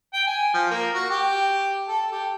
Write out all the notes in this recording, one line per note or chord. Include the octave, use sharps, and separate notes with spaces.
G5
G#5
F3
A#3
F#4
G4
A4
G4